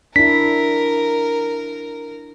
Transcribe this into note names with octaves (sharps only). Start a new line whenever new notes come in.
D4 E4 A#4 B6